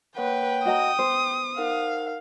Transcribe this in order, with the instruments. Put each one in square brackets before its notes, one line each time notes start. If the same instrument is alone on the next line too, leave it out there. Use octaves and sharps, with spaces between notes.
[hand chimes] A#3 C#5 F#5 [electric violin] B4 [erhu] G5
[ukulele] F#4 D#5 A#5 [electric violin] D#6
[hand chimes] B3 [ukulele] C5
[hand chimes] D#4 A#4 F#5 [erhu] F5